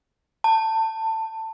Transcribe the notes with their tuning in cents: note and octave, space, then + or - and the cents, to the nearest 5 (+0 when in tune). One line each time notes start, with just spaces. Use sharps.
A5 +20